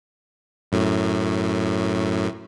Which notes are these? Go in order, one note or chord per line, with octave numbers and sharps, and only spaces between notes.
F#2 A2